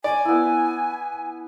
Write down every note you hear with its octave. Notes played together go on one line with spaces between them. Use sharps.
D5 G#5
B3 E4